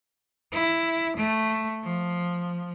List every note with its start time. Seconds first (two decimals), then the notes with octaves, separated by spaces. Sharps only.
0.53 E4
1.17 A3
1.83 F3